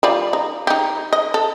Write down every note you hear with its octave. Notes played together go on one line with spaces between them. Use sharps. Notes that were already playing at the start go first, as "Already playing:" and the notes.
G3 F4 D5
D#4
D#4 G4
D#5
A4